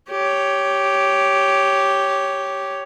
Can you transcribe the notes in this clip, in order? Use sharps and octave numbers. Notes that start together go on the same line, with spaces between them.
G4 C#5